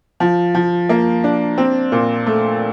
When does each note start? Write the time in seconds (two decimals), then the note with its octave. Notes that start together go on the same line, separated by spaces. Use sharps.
0.20 F3
0.55 F3
0.89 A#3
1.24 D4
1.58 C4
1.92 A#2
2.26 A3